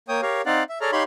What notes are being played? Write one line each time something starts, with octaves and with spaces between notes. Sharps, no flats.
A#3 C#5 G5 D#6
G4 A#4 C#5 F5
C4 D#4 D5 F5 F#5
E5
G#4 A4 C#5 D5 A#5 F6
D#4 G4 C#5 F5 B5 C6